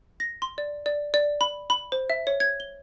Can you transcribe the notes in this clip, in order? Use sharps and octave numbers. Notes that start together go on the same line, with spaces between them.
A#6
C6
D5
D5
D5
B5
B5
C5
E5
C#5
G#6
G7